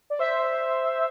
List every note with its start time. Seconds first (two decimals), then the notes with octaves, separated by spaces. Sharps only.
0.10 D5
0.19 C5 E5